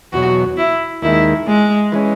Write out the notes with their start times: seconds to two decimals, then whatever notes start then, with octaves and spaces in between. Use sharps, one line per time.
0.13 E2 B2 F#3 F#4
0.57 E4
1.02 D#2 D#3 G#3 E4
1.48 G#3
1.92 E3 G#3 C#4